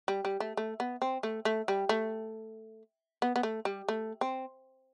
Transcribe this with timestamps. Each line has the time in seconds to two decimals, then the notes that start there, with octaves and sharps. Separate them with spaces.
0.08 G3
0.25 G3
0.40 A3
0.57 A3
0.80 B3
1.02 C4
1.23 A3
1.45 A3
1.68 G3
1.89 A3
3.22 B3
3.36 B3
3.43 A3
3.65 G3
3.88 A3
4.21 C4